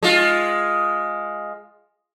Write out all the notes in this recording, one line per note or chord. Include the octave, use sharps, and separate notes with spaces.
G#3 F4